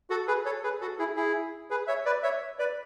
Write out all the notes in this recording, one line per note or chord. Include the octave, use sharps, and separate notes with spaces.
F#4 A4
G#4 B4
A4 C#5
G#4 B4
F#4 A4
E4 G#4
E4 G#4
G#4 B4
C#5 E5
B4 D5
C#5 E5
B4 D5